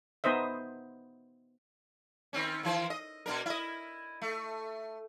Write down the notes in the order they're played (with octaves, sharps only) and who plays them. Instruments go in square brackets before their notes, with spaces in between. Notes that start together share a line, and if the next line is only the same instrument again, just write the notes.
[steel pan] B3 D#4 C5 D#5 E5
[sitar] D#3 C4 C#4
D#3 E3 C5
D#5
B2 D4 A#4
E4 D#5
A3